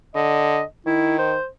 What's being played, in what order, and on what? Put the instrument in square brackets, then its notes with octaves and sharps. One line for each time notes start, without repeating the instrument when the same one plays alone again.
[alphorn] D3 [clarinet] D#5
[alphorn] D#3 [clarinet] E4
[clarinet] C5